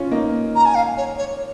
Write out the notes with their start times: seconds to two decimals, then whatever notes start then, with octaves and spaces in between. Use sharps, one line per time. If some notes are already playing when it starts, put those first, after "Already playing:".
Already playing: C#4 F4
0.11 A#3 D#4
0.56 A#5
0.66 G#5
0.75 F5
0.97 C#5
1.18 C#5